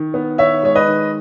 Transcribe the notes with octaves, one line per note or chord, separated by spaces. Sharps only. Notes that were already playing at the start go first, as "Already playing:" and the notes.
Already playing: D#3
B3
D#3 C#5 E5
G#3 C#5
B4 D#5
D#3